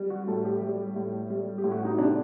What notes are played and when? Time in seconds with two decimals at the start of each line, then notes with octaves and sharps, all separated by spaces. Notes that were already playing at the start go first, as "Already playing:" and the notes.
Already playing: G3
0.10 F#4
0.27 A2 A4
0.45 G4
0.62 G3
0.96 A2
1.30 G3
1.58 G4
1.64 A2
1.71 F#4
1.85 D#4
1.98 C3 D4